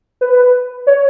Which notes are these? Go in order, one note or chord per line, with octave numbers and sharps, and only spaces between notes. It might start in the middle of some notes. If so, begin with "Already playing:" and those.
B4
C#5